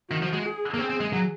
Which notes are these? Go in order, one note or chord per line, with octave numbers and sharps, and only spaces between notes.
D#3 F#4
F3
G#3
G#4
A#3
C4 G#4
C4
G#3
F#3